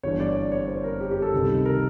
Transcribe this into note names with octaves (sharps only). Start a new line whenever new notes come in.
G1 G2 E3 C#5
D5
D5
C#5
C5
A#4
G4
G4
A4
C#2 C3 D#3 G3
A#4